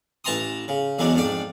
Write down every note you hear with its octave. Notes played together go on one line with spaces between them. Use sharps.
A1 E3 A5 A#5 C6 D#6
C#3
E2 E3 F#3 G#3 D4
F2 G#2 D4 D5